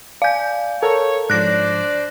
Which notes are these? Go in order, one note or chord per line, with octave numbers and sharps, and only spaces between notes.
D5 F5 G#5 G6
A4 A#4 C#5 F#5
G#2 F3 D4 C5 D5 F#6 A#6